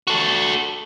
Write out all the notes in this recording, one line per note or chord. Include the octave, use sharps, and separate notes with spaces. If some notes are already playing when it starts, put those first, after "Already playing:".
F#4 A4